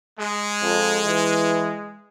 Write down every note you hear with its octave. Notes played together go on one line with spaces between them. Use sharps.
G#3
F2
E3